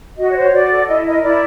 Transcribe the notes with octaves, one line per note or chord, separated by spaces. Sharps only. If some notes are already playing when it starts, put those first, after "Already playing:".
F#4 D#5
C#5
C5
C#5
F#4 D5
A4
E4 D#5
A#4 D#5
E4 D5